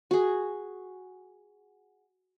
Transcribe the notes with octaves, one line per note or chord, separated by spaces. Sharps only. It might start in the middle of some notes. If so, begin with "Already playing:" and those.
F#4 G#4